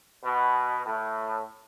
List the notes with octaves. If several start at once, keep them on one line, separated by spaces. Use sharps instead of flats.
B2
A2